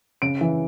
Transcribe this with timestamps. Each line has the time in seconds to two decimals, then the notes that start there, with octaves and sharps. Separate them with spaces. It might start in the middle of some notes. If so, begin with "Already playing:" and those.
0.22 C#3 D7
0.41 E3